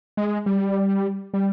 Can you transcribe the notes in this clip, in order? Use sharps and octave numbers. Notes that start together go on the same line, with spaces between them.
G#3
G3
G3